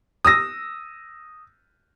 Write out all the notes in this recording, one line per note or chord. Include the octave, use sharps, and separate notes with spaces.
D#6 E6 A#6